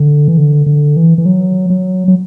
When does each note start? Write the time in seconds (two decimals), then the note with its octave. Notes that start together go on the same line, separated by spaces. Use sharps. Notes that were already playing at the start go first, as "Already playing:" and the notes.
Already playing: D3
0.28 E3
0.37 D3
0.66 D3
0.96 E3
1.18 E3
1.26 F#3
1.70 F#3
2.08 F#3